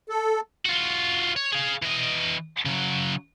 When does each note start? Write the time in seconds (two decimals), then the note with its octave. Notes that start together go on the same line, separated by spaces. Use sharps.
0.09 A4
0.65 F4 F#4
1.36 C#5
1.52 G#4 F5
1.82 E3 D#5
2.66 C#3 F#3